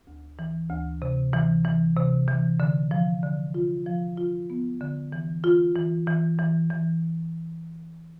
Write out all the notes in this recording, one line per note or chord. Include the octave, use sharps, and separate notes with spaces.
D2
E3
D2
C3
E3
E3
C3
E3
D3
F3
D3
F4
F3
F4
B3
D3
E3
F4
E3
E3
E3
E3